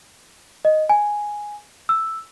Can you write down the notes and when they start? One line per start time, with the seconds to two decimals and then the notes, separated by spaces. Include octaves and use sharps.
0.65 D#5
0.89 G#5
1.89 E6